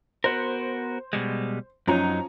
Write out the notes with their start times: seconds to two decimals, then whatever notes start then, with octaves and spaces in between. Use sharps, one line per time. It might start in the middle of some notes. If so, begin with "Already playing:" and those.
0.24 B3 F#4 A#4 C5
1.13 B2 G3 G#3
1.87 F#2 F3 F#3 C#4 D#4 A#5